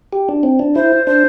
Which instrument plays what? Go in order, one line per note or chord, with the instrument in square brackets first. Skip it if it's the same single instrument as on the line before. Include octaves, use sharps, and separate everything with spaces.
[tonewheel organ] G4
D4
C4
D4
[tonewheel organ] E4 [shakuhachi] C5
[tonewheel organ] D4 [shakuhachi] C5